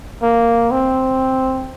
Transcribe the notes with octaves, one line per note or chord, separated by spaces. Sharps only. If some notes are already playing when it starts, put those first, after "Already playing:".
A#3
C4